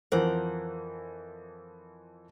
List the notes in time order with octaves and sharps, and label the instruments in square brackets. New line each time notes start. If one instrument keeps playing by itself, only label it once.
[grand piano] F2 E3 F3 [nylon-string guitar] A#4 C5 F#5